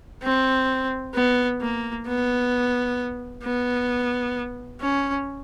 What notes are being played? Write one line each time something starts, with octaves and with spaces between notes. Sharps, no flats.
C4
B3
A#3
B3
B3
C#4